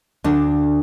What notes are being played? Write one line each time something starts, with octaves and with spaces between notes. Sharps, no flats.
D2 D4